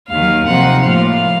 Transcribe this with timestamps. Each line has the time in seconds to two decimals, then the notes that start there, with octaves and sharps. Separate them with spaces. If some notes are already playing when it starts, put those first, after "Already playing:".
0.10 D#2 D#3 F#3 F5
0.48 C3 F3 C4 D#4 F#5
0.85 A2 F3 A#3 F4 F5